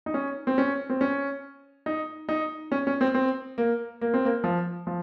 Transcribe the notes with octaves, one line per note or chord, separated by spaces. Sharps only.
D#4
C#4
C4
C#4
C4
C#4
D#4
D#4
C#4
C#4
C4
C4
A#3
A#3
C4
A#3
F3
F3